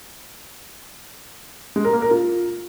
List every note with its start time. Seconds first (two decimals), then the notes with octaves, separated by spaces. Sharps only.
1.76 G#3
1.85 A#4
1.93 A#3
2.02 A#4
2.11 F4